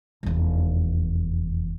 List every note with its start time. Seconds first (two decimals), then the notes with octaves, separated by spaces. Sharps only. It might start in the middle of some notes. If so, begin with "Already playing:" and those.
0.23 F1 E2